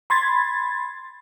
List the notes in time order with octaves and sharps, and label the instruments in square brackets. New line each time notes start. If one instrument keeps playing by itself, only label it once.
[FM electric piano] B5 C6 G#6 A6